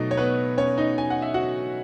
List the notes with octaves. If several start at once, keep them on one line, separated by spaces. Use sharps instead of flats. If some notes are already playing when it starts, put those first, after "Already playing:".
Already playing: B2 F#3 A3 D#4 D#5
C#5
B3 B4
C#4 C#5
D#4 D#5
G#5
F#5
E5
F#4 F#5